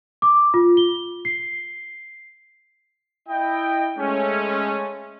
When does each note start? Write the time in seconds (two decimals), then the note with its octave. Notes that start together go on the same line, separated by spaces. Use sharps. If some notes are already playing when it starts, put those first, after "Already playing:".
0.22 D6
0.54 F4
0.77 G7
1.25 C7
3.28 E4 D#5 G5
3.97 G#3 A3 C#4